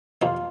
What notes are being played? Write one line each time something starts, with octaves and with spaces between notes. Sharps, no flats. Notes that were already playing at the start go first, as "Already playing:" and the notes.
F2 D#3 G3 C4 D#4 F4